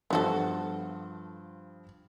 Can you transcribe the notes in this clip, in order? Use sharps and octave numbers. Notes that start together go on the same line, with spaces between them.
G2 F3 B3 F#4 A4